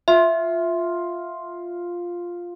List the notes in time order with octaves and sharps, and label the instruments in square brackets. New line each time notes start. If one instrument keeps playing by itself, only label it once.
[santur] F4 [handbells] E5